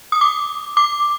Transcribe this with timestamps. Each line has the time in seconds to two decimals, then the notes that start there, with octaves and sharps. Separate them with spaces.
0.12 D#6
0.21 D6
0.77 D6